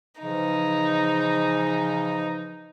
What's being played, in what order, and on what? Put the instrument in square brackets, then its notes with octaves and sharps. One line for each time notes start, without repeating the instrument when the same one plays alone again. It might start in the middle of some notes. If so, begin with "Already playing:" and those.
[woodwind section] C#3 E3 F3 [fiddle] D#4